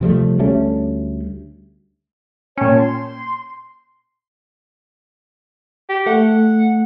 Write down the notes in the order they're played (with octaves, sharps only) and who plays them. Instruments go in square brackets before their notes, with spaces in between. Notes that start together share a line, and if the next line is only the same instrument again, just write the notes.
[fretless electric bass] C3 F3 G3 A3
D2 G3 A3 C#4
[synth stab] A#2 C#4 [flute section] C#5 G5 A5
[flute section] C6
[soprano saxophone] G4
[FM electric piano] A3 [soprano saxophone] F#5